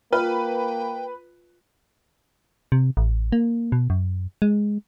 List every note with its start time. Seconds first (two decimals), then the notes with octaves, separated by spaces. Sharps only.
0.13 A#3 F4 B4 G5
2.72 C3
2.97 A1
3.32 A#3
3.72 B2
3.90 F#2
4.42 G#3